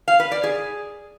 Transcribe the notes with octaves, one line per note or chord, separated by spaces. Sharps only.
F5
B4
D5
G#4